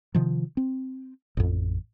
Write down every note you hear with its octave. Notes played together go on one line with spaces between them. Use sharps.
C3 D#3 F3
C4
A1 F2